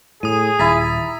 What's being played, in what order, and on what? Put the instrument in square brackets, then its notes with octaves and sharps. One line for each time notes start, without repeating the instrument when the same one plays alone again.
[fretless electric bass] A2 [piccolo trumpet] G#4 [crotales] D#6 D#7
[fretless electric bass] D#1 [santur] E4 A#5 [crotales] D#6 A6 B6